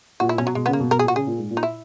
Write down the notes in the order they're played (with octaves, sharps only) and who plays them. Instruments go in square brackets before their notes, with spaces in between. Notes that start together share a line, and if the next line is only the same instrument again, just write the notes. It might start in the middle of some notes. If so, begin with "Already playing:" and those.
[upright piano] A#2 [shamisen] F#4
[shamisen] E4
[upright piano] B2 [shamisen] C#4
[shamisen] F#3
[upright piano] B2 [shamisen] G#3
[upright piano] C#3 [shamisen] B3
[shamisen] A#3
[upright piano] B2
[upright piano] B2 [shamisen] A#4
[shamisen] G#4
[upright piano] A#2
[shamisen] F#4
[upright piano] C#3 [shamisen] G#4
[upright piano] A#2
G#2
A#2
[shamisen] D#4
E4